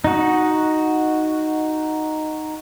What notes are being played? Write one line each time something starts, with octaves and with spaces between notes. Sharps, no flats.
D#4 F#4